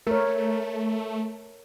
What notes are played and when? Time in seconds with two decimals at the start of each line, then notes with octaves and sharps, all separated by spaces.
0.07 A3 A#4 C#5